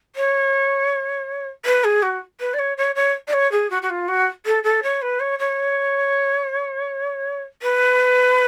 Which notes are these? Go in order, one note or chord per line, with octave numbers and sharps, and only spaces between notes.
C#5
B4
G#4
F#4
B4
D5
C#5
C#5
C#5
D5
C#5
G#4
F#4
F#4
F4
F#4
A4
A4
C#5
B4
C#5
C#5
B4